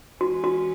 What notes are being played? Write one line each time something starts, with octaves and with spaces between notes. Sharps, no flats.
E3 G#3 C#4 F#4 G#4 B4
F#4